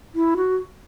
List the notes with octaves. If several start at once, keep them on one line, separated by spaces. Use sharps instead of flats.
E4
F#4